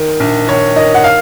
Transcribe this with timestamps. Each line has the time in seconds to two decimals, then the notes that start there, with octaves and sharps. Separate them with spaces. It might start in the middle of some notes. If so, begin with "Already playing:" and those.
Already playing: D#3
0.20 A#1
0.48 D#3 C#5
0.76 D#3 D#5
0.94 F#5
1.04 F5